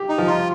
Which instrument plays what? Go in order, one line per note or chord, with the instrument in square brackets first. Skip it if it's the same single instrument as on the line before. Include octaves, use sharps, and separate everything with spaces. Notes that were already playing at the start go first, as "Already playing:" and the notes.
Already playing: [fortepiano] G4
[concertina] D#4
[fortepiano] F3
[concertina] F4